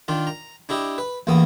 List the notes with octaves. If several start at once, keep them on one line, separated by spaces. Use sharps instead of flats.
D#3 D4 F4
A#5
D4 E4 G4 D#5
B4
A1 E2 A#3 B3 D#6